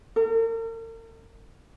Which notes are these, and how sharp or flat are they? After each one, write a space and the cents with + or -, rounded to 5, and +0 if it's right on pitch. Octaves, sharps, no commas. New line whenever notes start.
A#4 -45